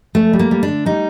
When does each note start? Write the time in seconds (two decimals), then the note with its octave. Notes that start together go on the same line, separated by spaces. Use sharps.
0.15 F2 A3
0.33 G3
0.39 A#3
0.51 G3
0.63 D4
0.68 D3
0.86 G3 D#4